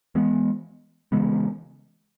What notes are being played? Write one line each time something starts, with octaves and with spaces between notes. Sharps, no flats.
E3 G#3 B3
C#3 E3 G#3 B3